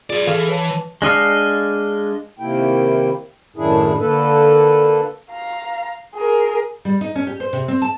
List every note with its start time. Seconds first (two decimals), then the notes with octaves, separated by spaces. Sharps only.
0.10 F4 G#4 B4 D5
0.27 E3 G#4 A4 F5
0.48 B4 C#5 A5
1.02 G#3 D4 D#5 F5
2.39 C3 D#3 A#3 E4 G5
3.56 F#2 A2 D#3 D4 E4 G#4
4.00 D3 A#3 A4 B4
5.32 F5 A#5
6.15 G#4 A#4
6.85 G3
7.01 D#4
7.16 C#4
7.27 G4
7.40 C5
7.53 C3
7.68 C4
7.82 A5